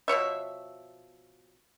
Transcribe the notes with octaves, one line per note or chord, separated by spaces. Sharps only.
B2 F3 C#5 E5